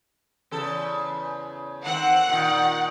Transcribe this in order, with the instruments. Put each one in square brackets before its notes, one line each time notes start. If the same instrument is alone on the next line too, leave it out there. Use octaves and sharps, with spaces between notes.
[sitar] E2 C#3 A4
[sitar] D#3 C4 [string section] F#5
[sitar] A#2 D#3